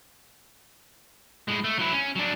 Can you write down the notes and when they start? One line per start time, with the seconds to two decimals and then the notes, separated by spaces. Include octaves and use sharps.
1.48 A2 G#3
1.64 A3
1.79 F#3 E4
1.93 C#4
2.16 F#3 D4